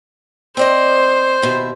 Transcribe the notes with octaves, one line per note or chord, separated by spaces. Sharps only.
C4 C5 D5 D#5
D#2 B2 E4